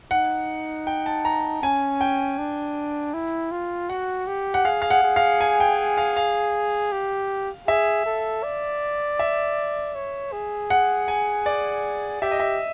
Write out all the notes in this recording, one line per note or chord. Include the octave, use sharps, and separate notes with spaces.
D#4 F#5
G5
A5
A#5
C#4 G#5
G5
D4
E4
F4
F#4 F#5
G4
F#5
G#4 F5
F5
F#5
G#4
F5
G#5
G5
F5
F5
G4
G#4 E5
A4
D5
E5
C#5
G#4
F#5
G#5
D5
G4 E5
D#5
E5